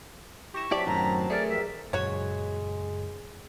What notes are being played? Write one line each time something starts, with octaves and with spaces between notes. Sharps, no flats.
E4 G4 C#6 A#6 E7
F#3 C4 E4 G4 D5 A5 B6
F#2 A2 D#3 A#5
A3 G#4 A#4 D5
E3 F3 G4 E5
F#2 A#2 C#3 G#3 F#4 C#5